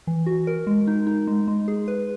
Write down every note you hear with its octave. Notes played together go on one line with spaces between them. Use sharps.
E3
F#4
A#4
G#3
D#4
D#4
G#3
G#3
G#4
B4